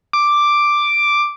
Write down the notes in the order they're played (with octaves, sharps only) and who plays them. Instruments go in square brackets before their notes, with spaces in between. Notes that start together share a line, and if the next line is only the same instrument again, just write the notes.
[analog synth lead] D6